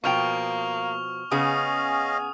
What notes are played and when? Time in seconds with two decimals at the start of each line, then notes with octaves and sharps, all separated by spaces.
0.04 B2 F3 A#3 G5 C#6 F6 F7
1.32 C#3 B3 C#4 G#4 D#5 F5 G#5 D#6